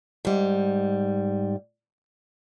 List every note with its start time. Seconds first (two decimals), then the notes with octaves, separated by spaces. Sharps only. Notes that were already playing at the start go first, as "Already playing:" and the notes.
0.25 G#2 G3